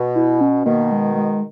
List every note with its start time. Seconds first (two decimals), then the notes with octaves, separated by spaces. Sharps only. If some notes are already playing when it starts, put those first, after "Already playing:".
Already playing: B2
0.15 E4
0.41 C#4
0.66 B2 D#3 A#3
0.92 G#3
1.16 G#3